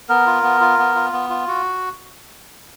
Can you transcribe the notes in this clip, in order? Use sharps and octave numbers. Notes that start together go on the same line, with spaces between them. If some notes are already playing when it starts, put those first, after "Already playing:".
B3 A#4
F4
B3
F4
B3
F4
B3
F4
F#4